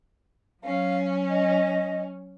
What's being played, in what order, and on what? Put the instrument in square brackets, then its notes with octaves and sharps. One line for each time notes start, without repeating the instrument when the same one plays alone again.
[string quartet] F#3 C#4 [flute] F5
[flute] D#5